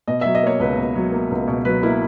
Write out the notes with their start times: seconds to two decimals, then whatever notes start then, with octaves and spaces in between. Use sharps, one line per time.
0.08 B2 D#5
0.21 F#3 E5
0.35 D#5
0.43 A#3 C#5
0.60 C#2 B4
0.78 B2
0.95 F#3
1.12 A#3
1.31 C#2
1.48 B2
1.65 F#3 B4
1.83 A#3 E4